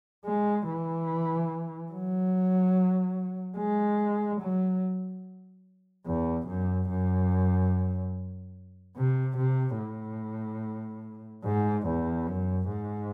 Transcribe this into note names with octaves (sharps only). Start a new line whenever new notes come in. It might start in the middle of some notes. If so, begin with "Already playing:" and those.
G#3
E3
F#3
G#3
F#3
E2
F#2
F#2
C3
C3
A2
G#2
E2
F#2
G#2